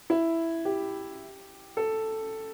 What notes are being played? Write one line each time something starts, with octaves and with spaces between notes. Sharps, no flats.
E4
G4
A4